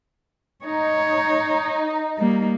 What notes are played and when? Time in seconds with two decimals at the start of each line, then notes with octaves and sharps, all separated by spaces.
0.65 D#4 C#5
2.18 G3 A#3